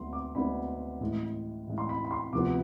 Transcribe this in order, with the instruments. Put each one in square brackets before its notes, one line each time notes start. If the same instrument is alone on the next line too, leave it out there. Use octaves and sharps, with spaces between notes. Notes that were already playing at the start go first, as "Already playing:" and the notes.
Already playing: [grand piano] D2 D3 G#3 B3 C6
D6
D2 D3 G#3 B3 B5
A1 A2 G#3
A1 A2 G#3
C6
B5
B5
C6
D2 C3 F3 B3 D6